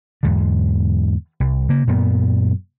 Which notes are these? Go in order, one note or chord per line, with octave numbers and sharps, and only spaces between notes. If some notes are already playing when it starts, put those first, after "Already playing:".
E2 G#2 D3
C2
C#3 A#3
F#2 A#2 B3